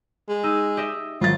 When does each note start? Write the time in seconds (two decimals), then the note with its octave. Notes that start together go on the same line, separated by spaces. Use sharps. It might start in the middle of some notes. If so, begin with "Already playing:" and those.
0.29 G#3
0.43 D#4 E6 D#7
0.77 G4 D#5 E5
1.21 G#1 F#3 F4 A6